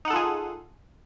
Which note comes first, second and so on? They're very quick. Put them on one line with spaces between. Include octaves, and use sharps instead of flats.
D#4 F#5 A4 F4 G#4